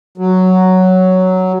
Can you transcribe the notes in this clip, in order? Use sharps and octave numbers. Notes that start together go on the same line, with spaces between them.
F#3